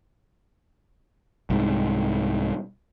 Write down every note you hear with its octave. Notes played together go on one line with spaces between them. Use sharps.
C2 G#2